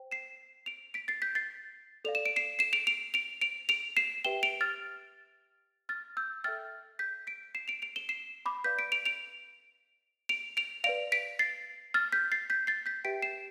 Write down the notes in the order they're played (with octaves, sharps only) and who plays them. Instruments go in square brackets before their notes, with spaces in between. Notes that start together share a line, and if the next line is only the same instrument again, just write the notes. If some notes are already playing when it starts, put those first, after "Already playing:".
Already playing: [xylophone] C5 G5
C7 E7
D7 F7
B6 D7
A6 C7
G6 B6
A6 C7
A4 D5 F5 F7
E7
D7
C7 E7
C7 E7
D7 F7
D7 F7
D7 F7
D7 F7
D7 F7
C7 E7
G4 B4 E5 G5 E7 G7
D7 F7
F6 A6
F6 A6
E6 G6
A4 E5 G5 F6 A6
G6 B6
B6 D7
C7 E7
D7 F7
D7 F7
E7 G7
C7 E7
B5 D6
B4 D5 F5 G6 B6
B6 D7
D7 F7
D7 F7
D7 F7
D7 F7
B4 D5 F5 D7 F7
B6 D7
A6 C7
F6 A6
G6 B6
A6 C7
G6 B6
A6 C7
G6 B6
G4 B4 E5 G5 B6 D7
C7 E7